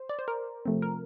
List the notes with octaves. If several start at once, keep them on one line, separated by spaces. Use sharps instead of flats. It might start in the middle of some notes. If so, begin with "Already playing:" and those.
Already playing: C5
D5
C5
A#4
C3 F3 A3 C4
A#4